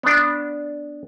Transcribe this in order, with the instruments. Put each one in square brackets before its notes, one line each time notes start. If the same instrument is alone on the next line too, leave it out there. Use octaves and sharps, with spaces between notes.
[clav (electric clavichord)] B3 D4